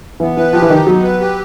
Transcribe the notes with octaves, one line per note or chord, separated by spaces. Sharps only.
E3 B3
E3 B4
F3 G4
E3
D#3 D#4
F#3 B3
B4
G4